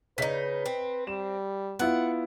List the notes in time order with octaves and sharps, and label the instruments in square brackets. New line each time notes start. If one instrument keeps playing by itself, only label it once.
[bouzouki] C#3 D#4 [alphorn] B4 [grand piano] D#5 B6
[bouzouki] C4
[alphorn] G3 [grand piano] E7
[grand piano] B3 E4 F4 [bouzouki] F#5